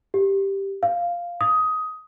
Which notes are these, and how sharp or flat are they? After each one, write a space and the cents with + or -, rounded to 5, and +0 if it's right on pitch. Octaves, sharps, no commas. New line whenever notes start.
G4 +0
F5 +0
D#6 +15